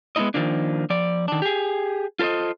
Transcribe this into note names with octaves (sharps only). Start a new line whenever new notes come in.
G#3 B3 C4 D#4 E4 D#5
D#3 F3 A#3 D4
F3 D5
D#3 D4
G4 G#4
F4 A4 B4 C5 D#5